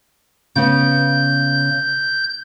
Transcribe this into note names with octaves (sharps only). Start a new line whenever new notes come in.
C#3 B3 G6